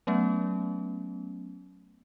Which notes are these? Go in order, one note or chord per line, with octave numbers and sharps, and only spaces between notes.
F#3 A3 B3 C#4